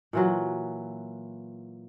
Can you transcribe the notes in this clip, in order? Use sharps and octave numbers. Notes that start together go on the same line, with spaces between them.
A#2 E3 F#3